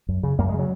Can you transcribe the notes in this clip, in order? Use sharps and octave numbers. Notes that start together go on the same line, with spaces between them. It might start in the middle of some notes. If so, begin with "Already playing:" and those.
F#2
C#3
F#2 A#3
G#3
C#3
F#3